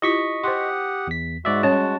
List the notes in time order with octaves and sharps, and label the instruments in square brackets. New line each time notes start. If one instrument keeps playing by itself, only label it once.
[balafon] E4 F4 G4 [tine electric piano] D#5 C#6 B6
[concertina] G4 F#5 D#6 [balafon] C5 C6
[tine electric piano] E2 B6
[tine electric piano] G#2 D5 E5 [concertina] G#3 F#4
[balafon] G3 C#4 C#5 [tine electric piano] A5